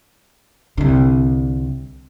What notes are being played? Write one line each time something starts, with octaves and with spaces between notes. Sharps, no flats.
C2 D3